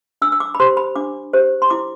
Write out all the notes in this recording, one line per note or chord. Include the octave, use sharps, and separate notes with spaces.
D4 E6
E6
D6
B5
G4 C5 C6
B5
D4 D6
G4 C5
C6
E4 D6